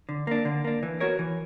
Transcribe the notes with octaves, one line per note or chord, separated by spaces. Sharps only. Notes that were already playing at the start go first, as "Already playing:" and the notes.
D3
A#3 D4
D3
A#3 D4
E3
B3 F#4 A#4 C#5
E3